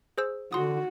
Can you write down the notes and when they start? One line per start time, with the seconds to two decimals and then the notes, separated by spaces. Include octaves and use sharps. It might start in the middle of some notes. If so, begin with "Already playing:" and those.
0.18 G#4 C5 E6
0.53 D3 F#4 C6 D#6